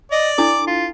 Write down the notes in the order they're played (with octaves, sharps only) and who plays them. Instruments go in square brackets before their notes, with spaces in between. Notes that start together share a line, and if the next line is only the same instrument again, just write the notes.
[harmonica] D5 [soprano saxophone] D#5
[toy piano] D4 E4 A4 [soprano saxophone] D6
[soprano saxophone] F4